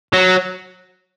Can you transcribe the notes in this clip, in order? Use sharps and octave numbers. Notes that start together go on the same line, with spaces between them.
F#3